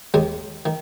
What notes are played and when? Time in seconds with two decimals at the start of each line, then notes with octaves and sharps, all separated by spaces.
0.14 D#2 D#3 G#3
0.66 D#3